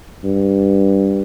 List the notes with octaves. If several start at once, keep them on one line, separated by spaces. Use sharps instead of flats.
G2